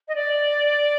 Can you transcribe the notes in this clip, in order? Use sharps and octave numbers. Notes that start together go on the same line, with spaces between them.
D#5
D5